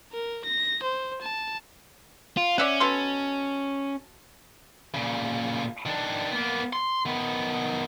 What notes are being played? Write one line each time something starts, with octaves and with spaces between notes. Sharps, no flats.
A#4
A#6
C5
A5
F4
C#4 D5 E5 F#5
B2 A4 C6
A#2 C#3
D#3 D4
A#3 B3
C6
D#3 B3